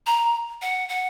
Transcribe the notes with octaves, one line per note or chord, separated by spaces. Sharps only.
A#5
F#5
F#5